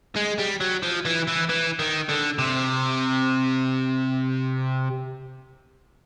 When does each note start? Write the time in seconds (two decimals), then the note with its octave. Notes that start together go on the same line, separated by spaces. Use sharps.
0.16 G#3
0.38 G3
0.60 F#3
0.83 F3
1.05 E3
1.27 E3
1.49 E3
1.79 D#3
2.09 D3
2.38 C3